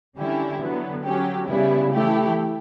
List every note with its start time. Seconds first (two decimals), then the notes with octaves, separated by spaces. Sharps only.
0.17 D3 G3 C#4 E4 G4
0.60 D3 F#3 B3
1.03 F#3 C#4 G4
1.47 C#3 G3 B3 E4
1.92 E3 A3 E4 G4